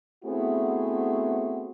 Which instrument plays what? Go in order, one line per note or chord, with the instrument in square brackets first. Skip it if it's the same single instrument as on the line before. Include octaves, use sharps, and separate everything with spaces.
[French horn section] A3 B3 C4 E4 F#4 G#4